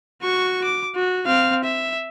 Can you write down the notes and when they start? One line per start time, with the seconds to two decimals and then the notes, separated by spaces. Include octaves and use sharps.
0.22 F#4 C#6
0.64 D6
0.96 F#4
1.26 C4 F5
1.65 E5